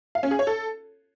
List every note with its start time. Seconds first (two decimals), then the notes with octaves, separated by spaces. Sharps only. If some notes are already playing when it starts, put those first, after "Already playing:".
0.15 F5
0.23 C#4
0.31 G#4
0.39 C#5
0.47 A4